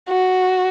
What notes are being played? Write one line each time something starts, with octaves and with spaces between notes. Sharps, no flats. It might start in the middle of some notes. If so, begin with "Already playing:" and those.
F#4